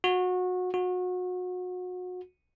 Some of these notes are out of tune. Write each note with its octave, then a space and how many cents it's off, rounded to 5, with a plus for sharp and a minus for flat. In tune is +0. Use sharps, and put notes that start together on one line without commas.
F#4 -25
F#4 -30